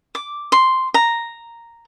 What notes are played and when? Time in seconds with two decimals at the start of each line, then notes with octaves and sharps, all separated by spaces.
0.15 D6
0.52 C6
0.94 A#5